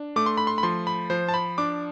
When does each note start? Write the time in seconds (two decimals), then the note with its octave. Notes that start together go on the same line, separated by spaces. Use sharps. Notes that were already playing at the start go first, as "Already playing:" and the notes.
Already playing: D4
0.16 A3 D6
0.26 C6
0.37 B5
0.47 C6
0.58 B5
0.63 F3 C6
0.87 B5
1.10 F3 C5
1.29 A5
1.34 B5
1.58 D4 D6